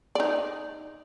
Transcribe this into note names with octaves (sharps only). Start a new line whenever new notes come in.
D#4 D5